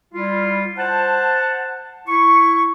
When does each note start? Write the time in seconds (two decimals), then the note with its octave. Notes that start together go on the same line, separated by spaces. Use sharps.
0.14 G3 E4 F4
0.78 C5 F#5 A5
2.07 E4 C#6